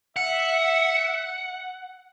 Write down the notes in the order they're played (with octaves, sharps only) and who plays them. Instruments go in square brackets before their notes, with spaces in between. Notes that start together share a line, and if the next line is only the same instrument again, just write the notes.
[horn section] E5 [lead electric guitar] F#5